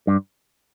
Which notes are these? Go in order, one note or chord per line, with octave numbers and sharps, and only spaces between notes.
G2